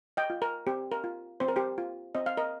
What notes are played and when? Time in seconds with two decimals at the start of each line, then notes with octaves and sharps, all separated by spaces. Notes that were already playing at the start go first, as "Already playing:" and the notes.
0.17 D#5 G5
0.30 F4
0.42 A#4
0.67 C4 G4
0.92 A#4
1.04 F4
1.40 C4 C5
1.48 A#4
1.56 G4 C5
1.78 F4
2.15 C4 D#5
2.26 F5
2.37 A#4 D#5